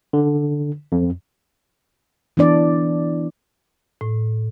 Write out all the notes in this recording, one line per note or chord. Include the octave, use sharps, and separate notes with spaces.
D3
F2
E3 B3 D4 D5
A2